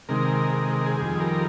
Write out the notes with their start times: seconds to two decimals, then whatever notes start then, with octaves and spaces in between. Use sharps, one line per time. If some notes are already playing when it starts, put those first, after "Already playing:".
0.09 C3 D#3 G#3 A#4
0.53 A#4
0.76 A#4
0.86 G#4
0.97 F2 D#3 G3 G#4
1.20 A#4